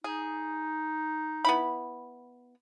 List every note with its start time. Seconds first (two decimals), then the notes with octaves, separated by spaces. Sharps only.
0.04 D#4 G#4
1.45 B3 E4 B5